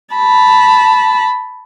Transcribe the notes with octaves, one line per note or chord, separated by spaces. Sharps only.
A5 B5